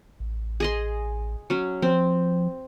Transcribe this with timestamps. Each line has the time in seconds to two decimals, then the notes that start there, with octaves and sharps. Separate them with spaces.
0.20 A1
0.60 G#4 D#5 C6
1.50 F#3 C#4
1.82 F3 C4